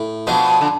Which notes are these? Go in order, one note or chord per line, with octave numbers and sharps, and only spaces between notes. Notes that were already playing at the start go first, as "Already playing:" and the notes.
Already playing: A2
B2 F3 B3 D4
D3